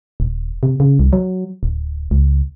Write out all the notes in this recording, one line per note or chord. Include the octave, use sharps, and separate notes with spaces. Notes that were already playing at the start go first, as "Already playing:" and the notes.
D#1
C3
C#3
C2
F#3
D1
C#2